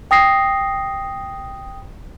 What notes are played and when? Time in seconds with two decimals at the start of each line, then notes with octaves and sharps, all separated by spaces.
0.11 G5 D#6 A#6 C7